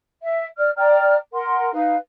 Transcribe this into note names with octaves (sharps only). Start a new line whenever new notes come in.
E5
D5 F6
D5 G5 A#5 F6
A#4 F#5 C6
D#4 B4 F5